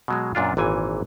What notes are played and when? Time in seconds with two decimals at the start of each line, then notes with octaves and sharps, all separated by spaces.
0.08 B2 F#3 G#3
0.35 F#2 A#2 D4 F4
0.57 G#1 A#2 E3 G#5